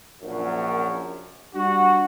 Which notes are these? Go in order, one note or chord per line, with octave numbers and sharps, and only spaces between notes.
A#1 F#2
G3 D4 F#4